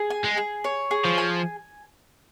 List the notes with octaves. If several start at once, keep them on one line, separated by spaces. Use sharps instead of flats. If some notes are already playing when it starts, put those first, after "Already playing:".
Already playing: G#4
G#5
G#3
G#4
C#5
G#4
F3
G#5